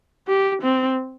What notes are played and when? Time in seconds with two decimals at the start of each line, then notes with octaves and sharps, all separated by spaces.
0.28 G4
0.63 C4